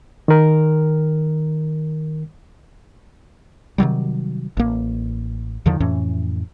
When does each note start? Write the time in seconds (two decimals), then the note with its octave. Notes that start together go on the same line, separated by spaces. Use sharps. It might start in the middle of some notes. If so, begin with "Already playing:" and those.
0.28 D#3 A#4
3.78 C3 D#3 F#3 G3
4.57 A1 A#3
5.66 E2 D3 D#3 F3
5.80 F2 A2 E3 C#4